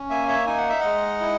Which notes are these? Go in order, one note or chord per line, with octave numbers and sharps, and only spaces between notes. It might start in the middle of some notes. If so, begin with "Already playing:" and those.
Already playing: C#4
A#3 E5 G#5
C#5 E5
D#4 G#5
F#5
E5
G#3 D#5 F#5
E4